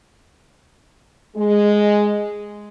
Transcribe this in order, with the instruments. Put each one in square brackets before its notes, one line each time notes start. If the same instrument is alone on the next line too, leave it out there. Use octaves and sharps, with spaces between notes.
[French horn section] G#3